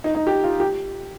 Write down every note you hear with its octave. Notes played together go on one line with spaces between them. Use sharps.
D#4
D#4
G4
F4
G4